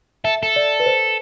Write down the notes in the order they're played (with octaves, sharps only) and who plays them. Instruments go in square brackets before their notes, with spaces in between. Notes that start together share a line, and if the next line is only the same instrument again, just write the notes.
[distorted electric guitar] A4 [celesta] E5
[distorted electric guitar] A4
[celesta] D5
B4
C5